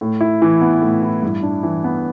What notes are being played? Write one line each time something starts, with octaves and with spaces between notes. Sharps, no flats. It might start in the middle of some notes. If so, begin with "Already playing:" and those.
A2
E4
E3
B3
A2
E4
G2
D4
E3
B3